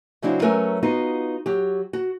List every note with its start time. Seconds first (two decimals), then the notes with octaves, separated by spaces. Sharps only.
0.22 C#3 F#3 C4 D4 E4 F#4
0.42 F#3 A3 C#4 A#4 B4
0.83 B3 D#4 F4 F#4
1.46 F#3 G4
1.93 F#4